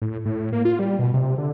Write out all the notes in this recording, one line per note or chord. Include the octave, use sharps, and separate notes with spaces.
A2
A2
A#3
F4
G3
B2
C3
D3